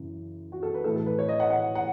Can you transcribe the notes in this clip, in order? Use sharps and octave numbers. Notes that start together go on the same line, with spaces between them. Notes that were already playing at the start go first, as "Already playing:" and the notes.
Already playing: F#2 C#3 E3
F#4
A4
B4
A2 E3 A4
A4
B4
C#5
D#5
F#5
F#5
F#5